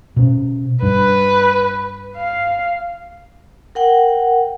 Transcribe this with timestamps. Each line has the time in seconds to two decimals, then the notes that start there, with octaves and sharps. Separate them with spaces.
0.16 B2 C#4
0.83 G2 B4
2.17 F5
3.75 A#4 F#5 G5